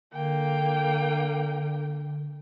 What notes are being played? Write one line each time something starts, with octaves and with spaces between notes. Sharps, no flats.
D3 A#3 G5